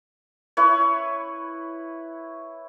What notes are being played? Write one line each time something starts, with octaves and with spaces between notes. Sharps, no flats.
E4 B4 C#5